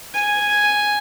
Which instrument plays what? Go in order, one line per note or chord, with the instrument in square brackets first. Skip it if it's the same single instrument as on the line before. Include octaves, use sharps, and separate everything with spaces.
[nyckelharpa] G#5